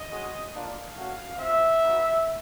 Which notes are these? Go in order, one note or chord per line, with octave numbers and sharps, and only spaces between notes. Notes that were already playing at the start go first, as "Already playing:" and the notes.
Already playing: D#5
G#3 C#4 F#4
A#3 D4 F4 F5
A3 C#4 F#4
C4 F4 E5
B3 D#4 F#4